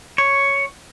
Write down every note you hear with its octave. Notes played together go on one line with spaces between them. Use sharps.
C#5